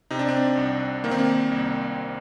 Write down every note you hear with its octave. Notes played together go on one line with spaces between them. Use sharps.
C3 D#4
D4
C4
D4
C2
D#3 A#3
C4
A#3
C2